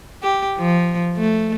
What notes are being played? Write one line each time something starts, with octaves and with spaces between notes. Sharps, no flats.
G4
F3
A3